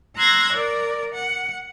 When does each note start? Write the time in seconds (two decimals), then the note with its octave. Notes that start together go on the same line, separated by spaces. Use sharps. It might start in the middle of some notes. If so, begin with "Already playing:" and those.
0.17 A#5 C6 E6 F#6 G#6 A#6
0.51 A#4 D5
1.14 F#5